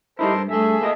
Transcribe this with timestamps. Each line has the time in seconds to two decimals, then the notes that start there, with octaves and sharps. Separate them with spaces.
0.19 G3 D#4 E4 A4 A#4 C5
0.33 G2
0.49 G2 A3 G#4 A4 E5
0.81 A#3 E4 D#5